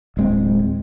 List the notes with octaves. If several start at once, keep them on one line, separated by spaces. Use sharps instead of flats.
D1 G#3 C4